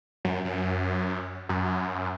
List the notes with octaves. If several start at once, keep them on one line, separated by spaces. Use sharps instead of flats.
F#2
F#2
F#2